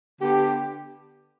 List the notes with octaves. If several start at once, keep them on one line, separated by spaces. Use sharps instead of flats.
D3 B3 G4